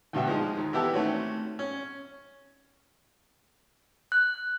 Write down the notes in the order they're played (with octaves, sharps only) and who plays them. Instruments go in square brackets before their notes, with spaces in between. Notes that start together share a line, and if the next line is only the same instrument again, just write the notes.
[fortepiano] D2 G2 B2 E5 G5
F3 G#3 D#4
D#2
E3 B3 E4 G4 A4
D#3 A3 C4 C#4 F#4
C#4
[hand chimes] F#6